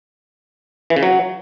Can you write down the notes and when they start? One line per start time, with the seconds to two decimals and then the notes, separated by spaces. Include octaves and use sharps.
0.90 E3
0.96 C#3
1.03 F#3